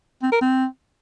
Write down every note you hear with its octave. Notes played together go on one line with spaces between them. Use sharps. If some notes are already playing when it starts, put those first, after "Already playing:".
C4
A#4
C4